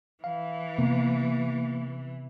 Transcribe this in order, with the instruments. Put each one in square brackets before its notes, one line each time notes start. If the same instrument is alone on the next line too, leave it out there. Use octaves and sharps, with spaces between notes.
[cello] E3 [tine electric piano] F5
[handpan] C3 B3 [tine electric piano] A#3